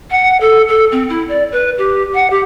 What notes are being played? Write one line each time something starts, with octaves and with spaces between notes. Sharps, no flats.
F#5
A4
A4
C4
E4
D5
B4
G4
F#5
G4